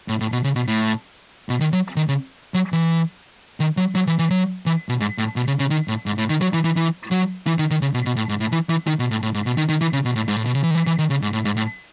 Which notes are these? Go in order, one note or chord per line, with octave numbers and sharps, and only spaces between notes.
A2
A2
B2
C#3
B2
A2
B2
D#3
F#3
D#3
C#3
F#3
E3
D#3
F#3
F#3
E3
E3
F#3
E3
B2
G#2
A2
B2
C#3
C#3
D#3
A2
G#2
A2
D#3
F#3
E3
E3
E3
F#3
E3
D#3
D#3
C#3
B2
B2
A2
G#2
A2
E3
E3
D#3
B2
A2
A2
G#2
B2
D#3
D#3
E3
C#3
B2
A2
G#2
A2
B2
C#3
E3
D#3
E3
E3
D#3
C#3
G#2
A2
G#2
A2